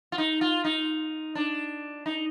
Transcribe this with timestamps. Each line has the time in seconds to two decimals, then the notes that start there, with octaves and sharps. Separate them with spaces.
0.12 F4
0.18 D#4
0.41 F4
0.65 D#4
1.35 D4
2.06 D#4